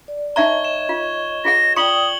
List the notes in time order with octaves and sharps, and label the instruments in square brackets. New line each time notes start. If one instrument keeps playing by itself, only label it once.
[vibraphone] D5
[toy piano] D#4 E5 A#5 [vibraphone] C#5 D#5 [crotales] C#6 G#6 G7
[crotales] E7
[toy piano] F4
[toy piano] F4 G#4 F#5 [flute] A#6
[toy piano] F4 C#6 [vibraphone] D5 G5 [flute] D#6 [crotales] C#7 F#7 G7